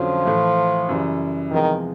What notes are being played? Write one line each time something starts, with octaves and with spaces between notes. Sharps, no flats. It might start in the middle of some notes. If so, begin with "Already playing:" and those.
Already playing: F2 D3 F3 F#3 C#4
A2 E3 A3
F#2 C#3 E3 G3
E2 C3 D#3 F3 G#3